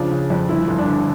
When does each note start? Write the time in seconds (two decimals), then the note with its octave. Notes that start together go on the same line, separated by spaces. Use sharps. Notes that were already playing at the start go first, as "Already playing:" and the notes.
Already playing: C#3 F3 D4
0.11 C#3
0.30 F2
0.49 G1 E4
0.68 G1
0.78 D4
0.87 D3